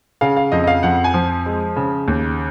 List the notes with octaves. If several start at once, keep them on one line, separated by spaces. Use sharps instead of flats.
C#3 F5
F5
F2 D#5
D#5
F5
F2 F#5
G#5
F3
G#3
C#3
D#2